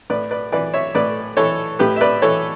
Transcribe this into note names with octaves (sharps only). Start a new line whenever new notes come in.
A2 B4 D5
B4 D5
E3 B4 D5
C#5 E5
A2 B4 D5
E3 A4 C#5
A2 G4 B4
E5
B4 D5
E3 A4 C#5